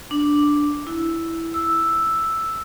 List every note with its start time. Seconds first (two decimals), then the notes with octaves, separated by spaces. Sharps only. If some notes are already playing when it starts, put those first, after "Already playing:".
0.11 D4
0.87 E4
1.54 E6